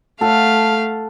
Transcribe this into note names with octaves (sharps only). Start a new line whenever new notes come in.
A3 A4 F5 F#5